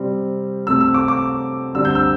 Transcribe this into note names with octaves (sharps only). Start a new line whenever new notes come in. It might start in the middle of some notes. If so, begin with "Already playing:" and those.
Already playing: C3 G3 C4
C3 A3 C4 E6
E6
D6
D6
D3 G3 C4 E6
G6
E6